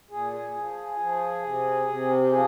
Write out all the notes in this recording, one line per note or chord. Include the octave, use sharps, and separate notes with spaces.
A#2 G#4
G#4
F3
F3
C3
C3
G4
F3 G#4